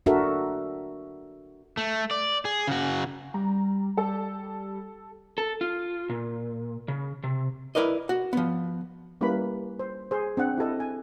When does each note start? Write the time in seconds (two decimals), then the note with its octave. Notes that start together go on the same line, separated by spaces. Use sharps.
0.06 D4 F#4 A4 A#4 E5
1.77 A3
2.11 D5
2.45 G#4
2.68 C#3 F#4
3.34 G3 A#5
3.97 G3 A4
5.38 A4
5.61 F4
6.10 A#2
6.88 C#3
7.24 C3
7.75 E4 F#4 A#4 B4 D5 D#5
8.09 F#4
8.33 F3 B3
9.21 G3 A#3 C#4 E4 B4 B5
9.79 C5
10.11 G#4 C5
10.37 C4 D4 F#5
10.58 E4 G4 A4 D#5
10.80 G#5